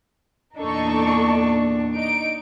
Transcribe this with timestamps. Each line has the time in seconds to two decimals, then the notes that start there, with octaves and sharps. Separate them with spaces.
0.57 E2 A#2 D4 D#4 A4 C#6
1.93 D#4 D7